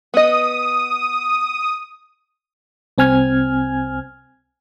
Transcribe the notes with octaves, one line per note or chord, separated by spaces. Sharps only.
B3 D#5 D#6
C2 C4 G#5 F6 G#6